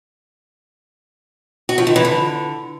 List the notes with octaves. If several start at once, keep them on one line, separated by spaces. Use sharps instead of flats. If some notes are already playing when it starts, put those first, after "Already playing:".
F#4
F3
D#3
E3
D3